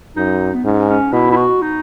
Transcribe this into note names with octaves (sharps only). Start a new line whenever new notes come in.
F#2 D#4
B3
G#2 C#4
C#4
B2 E4
E4
F#4
D#4